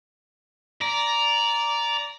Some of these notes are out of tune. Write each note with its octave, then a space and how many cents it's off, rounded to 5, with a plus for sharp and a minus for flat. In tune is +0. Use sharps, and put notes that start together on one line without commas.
D5 -15 A#5 +5